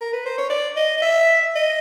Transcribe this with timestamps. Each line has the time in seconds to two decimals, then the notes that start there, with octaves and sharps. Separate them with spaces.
0.01 A#4
0.13 B4
0.26 C5
0.38 C#5
0.50 D5
0.77 D#5
0.97 D#5
1.02 E5
1.56 D#5